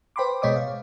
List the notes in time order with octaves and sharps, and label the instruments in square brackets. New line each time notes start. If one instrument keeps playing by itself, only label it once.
[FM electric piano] B4 C5 G5 B5 C6 D6
B2 G#3 C#5 D#5 D6 D#6
F5